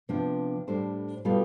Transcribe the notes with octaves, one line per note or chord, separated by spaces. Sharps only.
C3 F3 B3 D4 F4
A2 G3 D4 A4 C5
B2 G3 B3 F4 A4